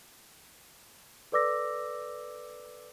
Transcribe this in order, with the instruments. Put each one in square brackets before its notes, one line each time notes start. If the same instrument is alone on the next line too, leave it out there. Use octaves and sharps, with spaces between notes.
[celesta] A4 B4 D5 D6 E6 A#6